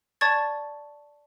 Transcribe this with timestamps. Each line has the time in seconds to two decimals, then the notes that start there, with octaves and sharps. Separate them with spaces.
0.21 D5 A5 C#6 G#6 A6